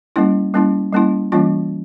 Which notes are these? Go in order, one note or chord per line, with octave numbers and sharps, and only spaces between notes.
G3 A#3 C#4 E4
G3 A#3 C#4 E4
G3 A#3 C#4 E4
E3 G3 A#3 C#4 F4